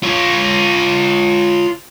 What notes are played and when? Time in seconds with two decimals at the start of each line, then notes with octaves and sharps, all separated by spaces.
0.03 F4 C#5